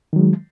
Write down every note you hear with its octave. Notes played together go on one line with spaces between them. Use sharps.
D#3 F#3 G#3